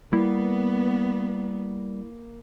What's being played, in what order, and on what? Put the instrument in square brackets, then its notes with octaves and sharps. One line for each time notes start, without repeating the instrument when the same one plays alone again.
[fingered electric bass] G3 [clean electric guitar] A#3 [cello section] B3 [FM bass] E4